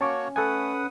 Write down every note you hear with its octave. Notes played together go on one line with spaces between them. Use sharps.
A#3 C#4 F#4 C#5 A5 C#6 D6
A3 A4 B4 F#5 G#5 D#6